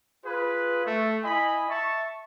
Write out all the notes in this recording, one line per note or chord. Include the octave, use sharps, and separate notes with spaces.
F4 G#4 B4
A3
E4 D#5 G#5 B5
E5 A5 C#6